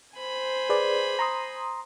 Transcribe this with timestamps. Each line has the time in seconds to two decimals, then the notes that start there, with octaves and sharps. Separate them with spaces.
0.18 C5 G#5 B5
0.70 G#4 B4 D5
1.19 A#5 C6 D#6